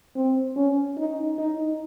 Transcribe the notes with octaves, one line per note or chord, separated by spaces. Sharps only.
C4
C#4
D#4
D#4